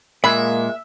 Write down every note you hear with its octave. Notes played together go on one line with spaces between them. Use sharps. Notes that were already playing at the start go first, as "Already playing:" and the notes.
A#2 G#3 A#3 E5 B5